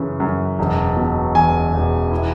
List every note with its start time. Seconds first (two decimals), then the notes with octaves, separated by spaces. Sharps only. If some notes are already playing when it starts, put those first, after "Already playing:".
Already playing: F#2 C#3 E3
0.20 F#2
0.59 E1
0.97 B2
1.35 E2 G#5
1.73 E1
2.12 E4